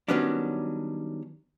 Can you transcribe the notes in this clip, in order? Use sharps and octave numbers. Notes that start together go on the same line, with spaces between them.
D#3 F#3 G3 B3 C#4 D4